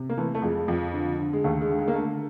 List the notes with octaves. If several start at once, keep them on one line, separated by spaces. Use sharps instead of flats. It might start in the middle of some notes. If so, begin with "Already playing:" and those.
Already playing: C3
A#3
E3 A3
A3
F2 G#3
F2
D3
D3
G#3
D#2 A3
G#3
D3
G#3
A#3
D3 A3